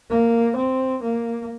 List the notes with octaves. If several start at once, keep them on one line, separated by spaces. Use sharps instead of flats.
A#3
C4
A#3